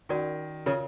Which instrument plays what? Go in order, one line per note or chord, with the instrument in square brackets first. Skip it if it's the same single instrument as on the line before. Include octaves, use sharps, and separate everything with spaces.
[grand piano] D#3 [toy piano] C#4 F#4 A#4 D5
[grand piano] C#3 [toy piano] F4 A#4 C#5